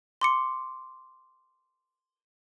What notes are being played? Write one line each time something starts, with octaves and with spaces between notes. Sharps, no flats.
C6 D6 C#7